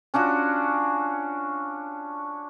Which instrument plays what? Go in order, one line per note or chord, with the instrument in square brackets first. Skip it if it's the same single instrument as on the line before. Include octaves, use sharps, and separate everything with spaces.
[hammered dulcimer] C#4 D4 F4 F#4